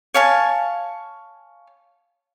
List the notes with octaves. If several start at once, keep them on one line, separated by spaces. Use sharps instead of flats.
C#5 F5 G#5 A5